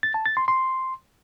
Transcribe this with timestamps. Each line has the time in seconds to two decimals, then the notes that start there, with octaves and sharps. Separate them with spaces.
0.03 A6
0.14 A5
0.26 A6
0.37 C6
0.48 C6